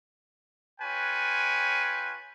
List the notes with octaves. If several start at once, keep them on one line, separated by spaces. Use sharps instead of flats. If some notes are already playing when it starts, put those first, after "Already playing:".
F4 B4 C#5 G5 G#5